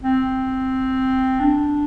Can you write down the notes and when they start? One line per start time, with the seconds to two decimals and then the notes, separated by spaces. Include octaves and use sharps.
0.03 C4
1.40 D4